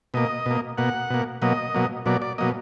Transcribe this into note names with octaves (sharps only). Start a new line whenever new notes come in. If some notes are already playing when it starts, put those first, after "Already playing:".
B2 A#3 D#5
B2 A#3
B2 A#3 F#5
B2 A#3
B2 F#3 A#3 D#5
B2 F#3 A#3
B2 F#3 A#3 D5
D5
B2 F#3 A#3 D#5